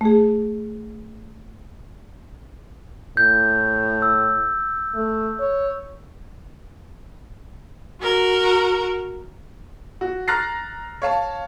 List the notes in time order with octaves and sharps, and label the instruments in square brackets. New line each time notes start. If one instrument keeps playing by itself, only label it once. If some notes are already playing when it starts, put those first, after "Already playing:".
[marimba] A3 G#4
[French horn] A2 [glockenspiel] G6
[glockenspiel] E6
[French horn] A3
C#5
[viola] F#4 A#4
[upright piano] F#4
A#5 F6 F#6 A6 A#6 C7
C#5 F5 A5